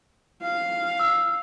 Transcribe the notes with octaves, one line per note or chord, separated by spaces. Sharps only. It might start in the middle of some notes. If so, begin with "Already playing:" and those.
F5
E6